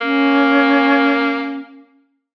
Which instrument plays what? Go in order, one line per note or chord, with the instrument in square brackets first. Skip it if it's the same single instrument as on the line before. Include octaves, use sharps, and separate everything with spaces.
[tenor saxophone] A#3 [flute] C#4